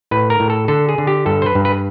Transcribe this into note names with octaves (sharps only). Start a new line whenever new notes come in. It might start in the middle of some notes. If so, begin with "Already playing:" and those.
A2 B4
A#4
A2
A4
D3 A4
G#4
D3
G4
G2 A4
C5
B4
G2
B4